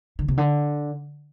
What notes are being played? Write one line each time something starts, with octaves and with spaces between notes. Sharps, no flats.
D3
C3
D3